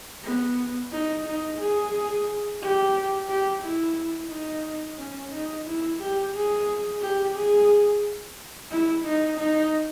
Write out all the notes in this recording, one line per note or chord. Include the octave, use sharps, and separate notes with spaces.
B3
D#4
D#4
G#4
G4
G4
E4
D#4
C#4
D#4
E4
G4
G#4
G4
G#4
E4
D#4
D#4